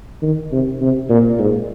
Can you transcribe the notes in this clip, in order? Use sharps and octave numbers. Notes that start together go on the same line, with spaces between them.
D#3
C3
C3
A#2
G#2